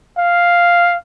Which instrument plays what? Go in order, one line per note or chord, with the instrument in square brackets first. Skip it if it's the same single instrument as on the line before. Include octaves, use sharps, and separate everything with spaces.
[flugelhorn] F5